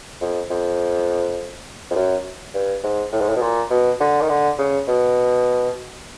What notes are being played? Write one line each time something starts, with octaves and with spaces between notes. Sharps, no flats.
F2
F2
F2
F#2
G2
G#2
A2
G#2
A2
B2
A#2
B2
D3
D#3
D3
C#3
B2